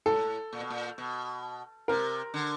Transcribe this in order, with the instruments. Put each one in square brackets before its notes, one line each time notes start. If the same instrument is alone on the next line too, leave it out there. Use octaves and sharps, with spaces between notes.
[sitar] A2 [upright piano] A4
[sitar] A#2
B2
A#2
B2
[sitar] C3 [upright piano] A#4
[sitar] D3